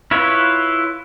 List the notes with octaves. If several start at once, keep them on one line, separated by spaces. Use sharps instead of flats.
E4 F4 B4 C#5